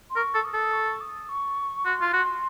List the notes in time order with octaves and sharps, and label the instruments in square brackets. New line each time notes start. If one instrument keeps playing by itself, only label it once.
[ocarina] C6
[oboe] A#4 [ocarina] C#6
[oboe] A4
[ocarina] D#6
[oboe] A4
[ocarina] C#6
D#6
C#6
[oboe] F#4 [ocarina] C6
[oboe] F4
F#4